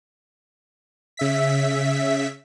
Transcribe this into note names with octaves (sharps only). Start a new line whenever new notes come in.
C#3 E5 B6